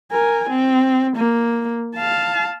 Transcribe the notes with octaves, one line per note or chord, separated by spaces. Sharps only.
A#4 G#5
C4
A#3
F5 A5